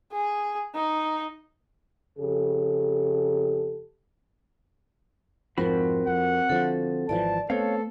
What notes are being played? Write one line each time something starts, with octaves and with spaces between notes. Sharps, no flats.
G#4
D#4
F2 C#3 G4 A4
F2 G#2 F3 C4 F#4 A#4 B5
F2 F#5
D3 F3 A4
G#1 E3 F3 D5 A5
A3 B3 C4 A4 C#5 F5